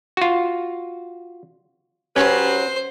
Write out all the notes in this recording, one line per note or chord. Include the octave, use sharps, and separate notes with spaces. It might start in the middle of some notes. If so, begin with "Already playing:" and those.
F4 F#4
F#3 C#4 G4 B4 C5